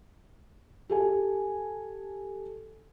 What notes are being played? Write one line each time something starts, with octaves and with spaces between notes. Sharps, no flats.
G4 A4 G#5